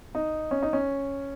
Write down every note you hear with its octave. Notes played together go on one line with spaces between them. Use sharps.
D#4
C#4
D#4
C#4